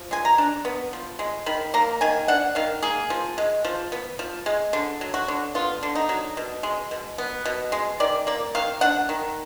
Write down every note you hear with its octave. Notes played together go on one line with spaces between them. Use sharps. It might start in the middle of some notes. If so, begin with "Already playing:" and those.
Already playing: F3
G#3 G#5
A#5
D4
B3
F3
G#3
D#3 B5
A#3 A#5
D#3 G#5
D4 F#5
D#3 F5
A#3 G#4
F3
G#3
F3
B3
F3
G#3
D3
F#3
F#4
D3
B3 F4
D3
D#4
F#3
B2
G#3
B2
B3
B2
G#3
D#3 D5
A#3 D5
D#3 F5
D4 F#5
D#3